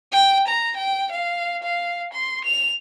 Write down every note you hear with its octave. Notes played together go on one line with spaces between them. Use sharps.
G5
A#5
G5
F5
F5
C6
F7